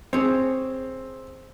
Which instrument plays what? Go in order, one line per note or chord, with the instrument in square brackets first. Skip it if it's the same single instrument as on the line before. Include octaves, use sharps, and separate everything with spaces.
[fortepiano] C4 [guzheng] G#4 C#5